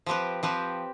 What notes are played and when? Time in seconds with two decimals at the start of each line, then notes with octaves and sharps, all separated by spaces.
0.06 F3 C4 G4 B4
0.43 F3 C4 G4 B4